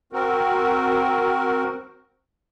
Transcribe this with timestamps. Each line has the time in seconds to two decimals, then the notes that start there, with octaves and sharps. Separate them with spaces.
0.13 C4 F#4 A#4